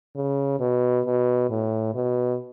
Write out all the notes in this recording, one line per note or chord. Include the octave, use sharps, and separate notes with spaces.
C#3
B2
B2
A2
B2